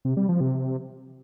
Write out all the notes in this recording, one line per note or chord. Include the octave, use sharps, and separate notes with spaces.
C3
G3
F3
C3